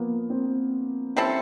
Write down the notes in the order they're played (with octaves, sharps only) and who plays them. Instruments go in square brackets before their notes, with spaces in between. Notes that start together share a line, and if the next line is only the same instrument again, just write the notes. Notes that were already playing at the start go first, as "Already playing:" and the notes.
Already playing: [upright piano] F3 A#3 B3
C4
[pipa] G3 C4 E4 A4 [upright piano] C#4